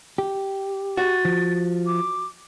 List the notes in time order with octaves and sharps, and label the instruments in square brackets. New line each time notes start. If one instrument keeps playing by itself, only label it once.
[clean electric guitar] G4
[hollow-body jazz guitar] F#4 [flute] A6
[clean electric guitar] F3
[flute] D6